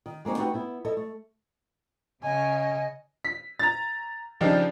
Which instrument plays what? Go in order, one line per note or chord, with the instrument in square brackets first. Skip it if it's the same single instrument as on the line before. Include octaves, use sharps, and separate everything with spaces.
[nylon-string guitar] D#3
G#3 A#3 C4 D#4 F#4
A3 D#4 F#4 G4 B4
B3 E4
E4 A4 D#5
A3
[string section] C#3 [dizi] D#5 [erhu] G#5
[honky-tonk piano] B6
A#5 A6
C#3 F3 D4 D#4 F4 G4